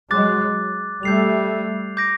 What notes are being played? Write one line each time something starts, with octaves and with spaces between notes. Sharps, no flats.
F#3 G#3 D6 F#6 A6
G3 A3 G6 C7 F7
D6 G6 A#6 D7